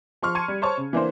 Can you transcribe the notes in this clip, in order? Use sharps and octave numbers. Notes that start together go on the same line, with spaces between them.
F3 C6 C#6 F6
A5 C6 C#6 G#6 C#7 D#7
G3
C5 C#5 A5 C#6
C#3
E3 A#3 D4 C5